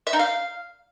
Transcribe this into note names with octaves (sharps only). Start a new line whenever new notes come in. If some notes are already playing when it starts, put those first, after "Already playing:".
E5
D#4
F5